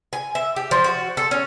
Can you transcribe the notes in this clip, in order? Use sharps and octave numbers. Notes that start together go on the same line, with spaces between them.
G#5
E5
G4
F3
F#4
A4
C#4